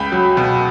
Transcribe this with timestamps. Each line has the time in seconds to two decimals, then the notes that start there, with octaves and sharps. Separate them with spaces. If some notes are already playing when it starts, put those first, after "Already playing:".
Already playing: C#2 G5 B5
0.12 F#3
0.37 B2